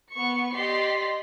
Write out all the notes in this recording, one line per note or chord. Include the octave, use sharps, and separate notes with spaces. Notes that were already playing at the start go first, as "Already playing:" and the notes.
B3 C#6 C#7
G4 D5 D#5 C6 B6 C7